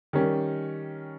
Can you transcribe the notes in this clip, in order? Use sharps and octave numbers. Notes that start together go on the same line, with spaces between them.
D#3 G3 C#4